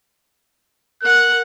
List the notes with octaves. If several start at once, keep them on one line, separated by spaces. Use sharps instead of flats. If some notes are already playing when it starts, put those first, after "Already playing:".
A#4 F#5 F#6